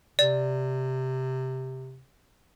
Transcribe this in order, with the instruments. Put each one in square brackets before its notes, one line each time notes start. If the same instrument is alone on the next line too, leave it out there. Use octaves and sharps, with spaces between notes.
[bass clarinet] C3 [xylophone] D5